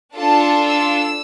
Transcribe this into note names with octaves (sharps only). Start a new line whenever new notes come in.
D4 F4 A4 A5
E6